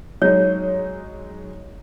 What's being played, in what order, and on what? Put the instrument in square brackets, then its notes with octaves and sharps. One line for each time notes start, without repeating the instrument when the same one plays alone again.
[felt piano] F#3 G#3 D#4 [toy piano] C#5